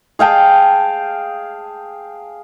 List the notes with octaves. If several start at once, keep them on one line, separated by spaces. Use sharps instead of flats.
G#4 F5 G5 A5